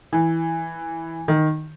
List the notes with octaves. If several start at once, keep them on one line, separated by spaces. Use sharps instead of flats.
E3
D#3